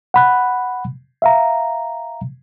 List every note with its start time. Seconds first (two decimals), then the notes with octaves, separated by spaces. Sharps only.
0.14 F#5 B5 F#6
1.22 E5 F5 A#5